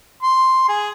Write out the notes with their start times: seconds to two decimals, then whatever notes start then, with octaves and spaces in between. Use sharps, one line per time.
0.22 C6
0.69 G#4